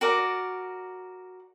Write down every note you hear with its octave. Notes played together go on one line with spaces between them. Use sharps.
F#4 A#4 D5